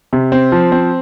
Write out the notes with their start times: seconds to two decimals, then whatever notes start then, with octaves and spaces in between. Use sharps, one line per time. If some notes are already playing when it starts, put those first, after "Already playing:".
0.13 C3
0.32 C4
0.52 F3
0.72 C4